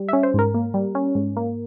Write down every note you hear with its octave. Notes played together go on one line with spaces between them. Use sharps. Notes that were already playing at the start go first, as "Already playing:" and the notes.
Already playing: G3
C#4 E5
C5
G#2 A#4
A#3
G3
C#4
G#2
A#3